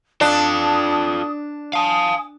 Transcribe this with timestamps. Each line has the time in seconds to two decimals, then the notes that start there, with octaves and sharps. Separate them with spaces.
0.21 D4 F4 A4 D#6
1.73 F5 G#5 A5 D#6